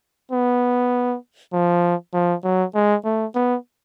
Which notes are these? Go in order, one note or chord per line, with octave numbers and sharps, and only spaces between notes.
B3
F3
F3
F#3
G#3
A3
B3